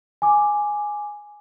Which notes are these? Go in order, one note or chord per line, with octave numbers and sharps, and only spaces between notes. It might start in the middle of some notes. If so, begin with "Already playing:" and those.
G#5 D6